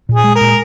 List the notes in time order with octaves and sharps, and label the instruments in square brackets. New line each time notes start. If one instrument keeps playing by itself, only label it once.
[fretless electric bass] A#2
[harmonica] G#4
[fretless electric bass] G#3
[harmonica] A#4
[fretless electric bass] A#2